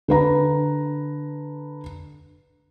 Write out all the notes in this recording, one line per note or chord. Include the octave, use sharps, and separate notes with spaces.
D3 B4 A#5